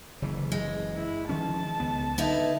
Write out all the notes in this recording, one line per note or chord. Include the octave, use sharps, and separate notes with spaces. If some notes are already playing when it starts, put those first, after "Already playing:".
F#1 C#3 E3
G#3
E4
D#3 F3 C#4 A5
C#2 B3
D3 D#4 E4 B4